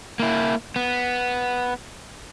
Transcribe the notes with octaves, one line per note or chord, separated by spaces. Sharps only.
A#3 E4
B3